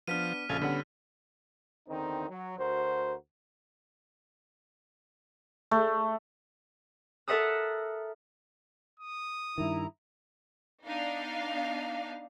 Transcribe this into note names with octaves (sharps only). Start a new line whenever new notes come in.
F3 B3 D4 F6 B6 D#7
A#1 C#3 F3 A4 F5 G#5
D3 G3 B3 C#4 F#5
E2 D3 D#3 C4 D#4
F#3
D2 F#4 A#4 C5
A3
A4 A#4 E5 F#5 D#6 E6
D#6
G2 D#3 E4 A#5
B3 D4 D#4 F5